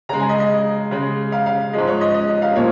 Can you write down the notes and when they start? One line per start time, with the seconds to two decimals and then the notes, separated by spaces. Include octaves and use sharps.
0.09 C#3 G#3 A#5
0.20 G#5
0.29 D#5
0.40 D#5
0.91 C#3 G#3
1.32 F5
1.46 F5
1.73 G#2 F3 G#3 D#5
1.87 C#5
2.01 D#5
2.14 D#5
2.28 D#5
2.42 F5
2.55 A#2 F3 A#3 C#5